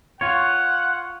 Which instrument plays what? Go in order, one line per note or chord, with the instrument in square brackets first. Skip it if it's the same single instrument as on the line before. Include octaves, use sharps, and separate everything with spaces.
[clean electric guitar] F4 C#5 [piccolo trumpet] F#5